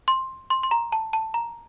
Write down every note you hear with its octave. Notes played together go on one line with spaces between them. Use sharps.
C6
C6
C6
A#5
A5
A5
A#5